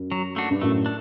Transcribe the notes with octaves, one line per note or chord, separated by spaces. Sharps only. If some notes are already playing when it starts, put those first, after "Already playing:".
Already playing: F#2
F#3
A3 D4 F#4
G2
F#2 A2 A3
D4